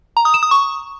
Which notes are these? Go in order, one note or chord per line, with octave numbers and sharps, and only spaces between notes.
A#5
D#6
E7
D#6
C#6